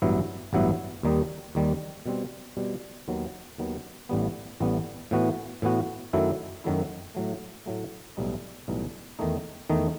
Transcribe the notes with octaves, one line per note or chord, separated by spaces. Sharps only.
A1 G2 F#3 B3 E4
A1 G2 F#3 B3 E4
D#2 D#3 G3 D#4
D#2 D#3 G3 D#4
B2 G3 C4
B2 G3 C4
D#2 D#3 F#3 B3
D#2 D#3 F#3 B3
A1 A2 G3 B3
A1 A2 G3 B3
A2 E3 B3 F#4
A2 E3 B3 F#4
F#2 D#3 F#3 A3 E4
F#2 D#3 F#3 A3 E4
A2 F#3 A3
A2 F#3 A3
B1 A2 E3 G3 D#4
B1 A2 E3 G3 D#4
E2 D#3 A3 D#4
E2 D#3 A3 D#4